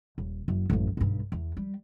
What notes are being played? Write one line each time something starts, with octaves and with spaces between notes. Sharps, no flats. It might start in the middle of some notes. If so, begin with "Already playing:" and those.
D#1
F#1
A1 F#2
B1 G2
E2
G3